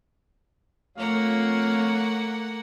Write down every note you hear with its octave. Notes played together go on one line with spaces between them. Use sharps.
F2 A3 A#3 C#5 F5 F#5